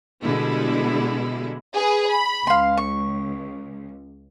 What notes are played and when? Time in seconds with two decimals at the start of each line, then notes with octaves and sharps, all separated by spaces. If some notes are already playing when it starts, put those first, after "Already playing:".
0.23 B2 D3 G3 G#3 E4
1.75 G#4 B4
2.08 B5
2.47 C#2 F5 C6
2.77 C#6